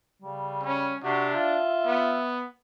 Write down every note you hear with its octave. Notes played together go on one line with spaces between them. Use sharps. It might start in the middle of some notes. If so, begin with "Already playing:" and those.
C#3 G3
C#4
C3 D4 F#4
F4 E5
B3